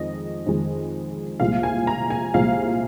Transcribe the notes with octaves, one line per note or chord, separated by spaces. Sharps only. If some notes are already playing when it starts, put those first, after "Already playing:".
Already playing: F2 D#3 G#3 D#5
F2 D#3 G#3
C2 A#2 F3 G#3 F5
G#5
A#5
G#5
C2 A#2 F3 G#3 F5